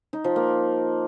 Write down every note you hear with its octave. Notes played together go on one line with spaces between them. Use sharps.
D#4
F3
A#3